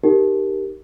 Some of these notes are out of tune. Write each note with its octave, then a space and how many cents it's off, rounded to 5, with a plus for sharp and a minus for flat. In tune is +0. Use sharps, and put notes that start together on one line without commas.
D#4 +0 G4 +0 A#4 +0